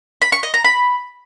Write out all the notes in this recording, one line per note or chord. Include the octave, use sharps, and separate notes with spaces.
B5
C#6
D#5
A#5
B5